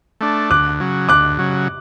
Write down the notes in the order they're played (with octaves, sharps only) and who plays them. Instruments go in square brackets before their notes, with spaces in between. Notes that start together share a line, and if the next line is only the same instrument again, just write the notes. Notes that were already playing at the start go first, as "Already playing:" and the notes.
[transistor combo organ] A3 D4
[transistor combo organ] D2 [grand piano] D6 F#6
[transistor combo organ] C#3 F#3
[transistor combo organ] D2 [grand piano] D6 F#6
[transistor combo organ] C#3 F#3